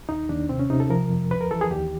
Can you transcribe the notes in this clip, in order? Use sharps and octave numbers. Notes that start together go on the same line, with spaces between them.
D#2 D#4
D#2 D4
C3 C4
C#4
C3 D#4
A4
F3 A#4
F2
C#2 B4
A#4
E3 A4
G#4
D#2 G4